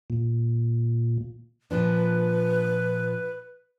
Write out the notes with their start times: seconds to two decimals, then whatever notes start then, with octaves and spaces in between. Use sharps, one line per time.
0.10 A#2
1.71 A#2 F3 D4 B4